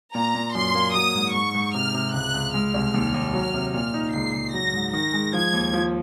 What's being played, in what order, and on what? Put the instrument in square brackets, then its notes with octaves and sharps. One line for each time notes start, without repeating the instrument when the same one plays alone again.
[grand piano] A#2 [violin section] A#5
[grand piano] A#2
[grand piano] F#2 [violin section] C6
[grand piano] A#3
[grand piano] F#3 [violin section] D#6
[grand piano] G#2
[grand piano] G#2 [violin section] C#6
[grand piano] G#2
[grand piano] C3 [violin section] F6
[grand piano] C3
[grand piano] C#2 [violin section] F#6
[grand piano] C#2
[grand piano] G#3 [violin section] F6
[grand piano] C2
D#2
D#2
[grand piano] F#3 [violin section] F6
[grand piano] C3
[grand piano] A#2 [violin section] F6
[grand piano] D#4
[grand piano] C#2 [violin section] C7
[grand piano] C#2
[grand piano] F#3 [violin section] A#6
[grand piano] G#2
[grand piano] D#3 [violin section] A#6
[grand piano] G#3
[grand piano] F3 [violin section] G#6
[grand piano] D#2
F3